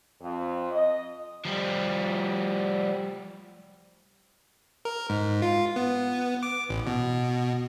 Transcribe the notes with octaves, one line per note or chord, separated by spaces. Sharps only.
F2
D#5
F3 G3
A#4
G#2
F4
B3
D6
A1
B2